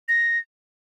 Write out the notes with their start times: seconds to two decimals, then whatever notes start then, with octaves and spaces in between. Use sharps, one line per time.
0.09 A#6